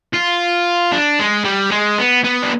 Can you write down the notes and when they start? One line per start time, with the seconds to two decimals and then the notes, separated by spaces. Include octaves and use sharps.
0.13 F4
0.92 D4
1.19 G#3
1.45 G3
1.71 G#3
1.98 B3
2.24 B3
2.42 D4